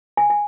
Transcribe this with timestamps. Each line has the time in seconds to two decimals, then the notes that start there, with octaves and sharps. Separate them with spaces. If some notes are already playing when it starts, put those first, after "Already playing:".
0.17 G#5
0.30 G#5